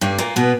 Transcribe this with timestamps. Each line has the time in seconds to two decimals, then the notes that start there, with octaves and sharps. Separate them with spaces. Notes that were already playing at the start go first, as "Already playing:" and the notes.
0.01 G2 G3
0.18 A#2 A#3
0.36 B2 B3